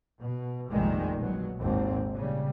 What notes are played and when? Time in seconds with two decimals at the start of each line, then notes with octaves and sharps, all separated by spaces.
0.20 B2
0.71 F1 A#1 D#3 G3 G#3
1.19 B2 F#3
1.59 G#1 D#2 C4
2.14 A#2 C#3 G3